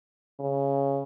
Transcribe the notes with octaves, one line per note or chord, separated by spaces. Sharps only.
C#3